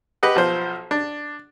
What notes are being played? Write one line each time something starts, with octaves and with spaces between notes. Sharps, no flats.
G4 B4 D#5 F#5
B1 F3 C5
D4